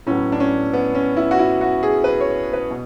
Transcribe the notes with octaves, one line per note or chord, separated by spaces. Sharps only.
A2 F#3 B3 C#4
D4
C#4
B3
C#4
E4
F#4
E4
F#4
G#4
B4
C#5
B4
B2